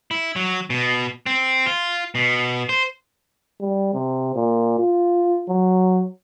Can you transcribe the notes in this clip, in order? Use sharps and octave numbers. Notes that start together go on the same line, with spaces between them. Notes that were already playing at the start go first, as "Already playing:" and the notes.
E4
F#3
B2
C4
F4
B2
C5
G3
C3
A#2
F4
F#3